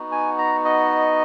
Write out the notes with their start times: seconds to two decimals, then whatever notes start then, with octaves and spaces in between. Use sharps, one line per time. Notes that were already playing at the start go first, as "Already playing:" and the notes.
Already playing: B3 D#4 F#4
0.12 G#5
0.38 A#5
0.65 D#5